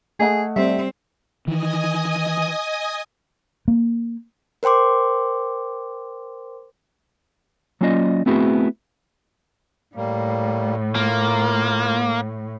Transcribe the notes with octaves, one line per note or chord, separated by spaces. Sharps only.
A3 G#4 D#5 F#5
G3 C4 E5
D#3 E3 D#5 G#5 D#6
A#3
A#4 C5 G5 C6 D6
F#3 A#3 C#4 F4 D5 D#5
A3 B3 C4 E4 F#4 G#4
A2 G3 A#3
A#3 F4